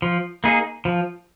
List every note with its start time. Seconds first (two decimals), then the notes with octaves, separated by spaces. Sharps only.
0.02 F3
0.44 A#3 D#4 G#4
0.85 F3